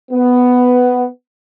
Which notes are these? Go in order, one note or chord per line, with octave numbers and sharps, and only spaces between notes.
B3